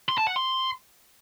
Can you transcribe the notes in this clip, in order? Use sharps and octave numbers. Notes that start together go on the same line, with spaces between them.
C6
A5
F#5
C6